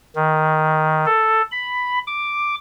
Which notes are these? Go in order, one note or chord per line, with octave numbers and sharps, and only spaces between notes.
D#3
A4
B5
D6